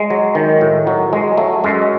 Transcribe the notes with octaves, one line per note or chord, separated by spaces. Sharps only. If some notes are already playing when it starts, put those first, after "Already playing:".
Already playing: G#3
F#3
D#3
A2
F#3
F#3 G#3
F#3 A3
F#2 G#3